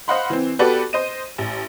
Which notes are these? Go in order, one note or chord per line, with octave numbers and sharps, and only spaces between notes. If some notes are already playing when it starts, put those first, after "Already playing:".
C5 D#5 F5 F#5 B5 C6
E3 C4
B3 F#4 G4 A4 B4 D5
C5 D#5 D#7
A1